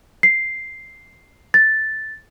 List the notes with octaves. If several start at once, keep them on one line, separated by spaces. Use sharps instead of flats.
C7
A6